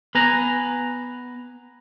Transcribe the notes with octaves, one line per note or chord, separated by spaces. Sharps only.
B3 B4 G#5 A#5